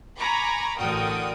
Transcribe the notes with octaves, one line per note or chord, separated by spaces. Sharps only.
G#5 A#5 B5 C#6 D6
A1 D3 F#4 A#4 G5 D#6